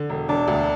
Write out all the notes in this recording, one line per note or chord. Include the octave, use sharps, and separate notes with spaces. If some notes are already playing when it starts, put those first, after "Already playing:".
Already playing: D3
E1
E1 D4
D2